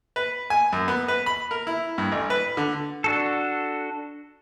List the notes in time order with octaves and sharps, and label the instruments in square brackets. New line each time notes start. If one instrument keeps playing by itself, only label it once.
[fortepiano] B4
G#5
F#2
B3
B4
B5
A#4
E4
G2
A1
B4
D3
[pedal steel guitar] D4 F#4 A4